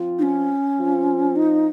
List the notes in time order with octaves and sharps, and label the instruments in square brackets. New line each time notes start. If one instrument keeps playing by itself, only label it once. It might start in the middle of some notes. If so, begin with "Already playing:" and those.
Already playing: [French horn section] F3 C4 F4
[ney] D#4
C#4
[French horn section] F3 C4 F4
[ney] D#4